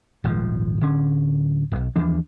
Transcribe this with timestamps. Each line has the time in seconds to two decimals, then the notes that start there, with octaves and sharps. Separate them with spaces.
0.24 D#1 G#1 G#2 F3
0.81 D1 D3 C#4
1.72 D1 B1
1.96 D#2 E3 F3 D4